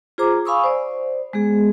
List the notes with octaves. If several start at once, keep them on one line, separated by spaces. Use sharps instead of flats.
F4 G#4 C5 A#5 D6
F5 G#5 B5 C#6 D#6 E6
C5 D5
G#3 B3 G#4